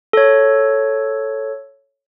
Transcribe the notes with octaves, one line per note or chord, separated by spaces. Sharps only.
A4 C#5